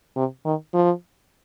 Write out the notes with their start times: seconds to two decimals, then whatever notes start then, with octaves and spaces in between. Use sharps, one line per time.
0.16 C3
0.45 D#3
0.73 F3